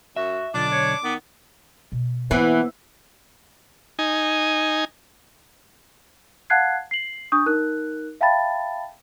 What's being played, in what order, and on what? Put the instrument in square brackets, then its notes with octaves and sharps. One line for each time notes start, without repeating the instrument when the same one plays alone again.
[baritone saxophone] F#2 [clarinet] F#4 [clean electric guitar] E5
[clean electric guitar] B1 D3 [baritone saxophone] D4 [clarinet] F4 [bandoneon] D6
[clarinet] C#5
[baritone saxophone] D#3 [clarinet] B3
[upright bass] B2
[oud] E3 [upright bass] A#3 [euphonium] B3
[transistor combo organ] D#4 G#5
[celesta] F5 F#5 A5 F#6 G#6 C7
C7 F#7
D4 C#6 D#6 G6
D#4 A#4 F#6
E5 F5 G5 A5 B5 A6